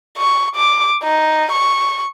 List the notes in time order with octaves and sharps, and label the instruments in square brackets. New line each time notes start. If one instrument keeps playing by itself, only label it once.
[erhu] C#6
D6
D#4
C#6